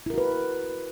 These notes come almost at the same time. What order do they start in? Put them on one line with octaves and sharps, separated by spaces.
E4 A#4 F#4 B4